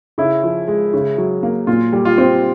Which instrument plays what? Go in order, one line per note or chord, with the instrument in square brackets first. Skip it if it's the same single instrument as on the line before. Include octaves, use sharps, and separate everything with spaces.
[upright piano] C#3 [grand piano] E4
[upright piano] F3
G#3
C#3
F#3
A#3
[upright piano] A#2 [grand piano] F4
[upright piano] G3
[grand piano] F4
[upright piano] C4